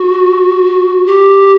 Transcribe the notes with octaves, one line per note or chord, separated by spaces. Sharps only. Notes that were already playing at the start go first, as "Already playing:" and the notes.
Already playing: F#4
G4